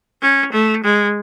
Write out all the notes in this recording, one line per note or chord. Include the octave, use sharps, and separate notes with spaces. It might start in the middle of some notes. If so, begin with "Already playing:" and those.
C#4
A3
G#3